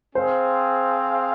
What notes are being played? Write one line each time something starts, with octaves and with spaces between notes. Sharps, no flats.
C4 G#4 C5 F5